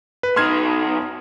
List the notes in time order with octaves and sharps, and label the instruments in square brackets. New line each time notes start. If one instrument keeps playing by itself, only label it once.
[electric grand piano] B4
[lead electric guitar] B1 D#4 [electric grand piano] C6 F6 G#6